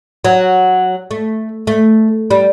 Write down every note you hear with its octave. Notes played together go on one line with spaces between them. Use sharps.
F#3
A3
A3
G3